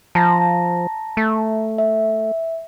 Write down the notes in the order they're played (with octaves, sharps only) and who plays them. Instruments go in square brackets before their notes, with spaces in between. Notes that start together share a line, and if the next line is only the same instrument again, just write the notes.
[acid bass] F3 [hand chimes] A5 A#5 A#6
[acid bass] A3
[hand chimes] E5